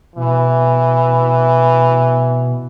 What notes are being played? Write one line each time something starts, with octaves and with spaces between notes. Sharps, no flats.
B2 E3